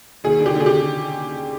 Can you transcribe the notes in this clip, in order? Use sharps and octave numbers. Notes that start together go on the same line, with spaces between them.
D#2 G#4
D3
G4
D3 G#4
G4